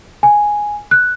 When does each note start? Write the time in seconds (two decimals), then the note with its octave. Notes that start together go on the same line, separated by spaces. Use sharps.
0.23 G#5
0.91 F#6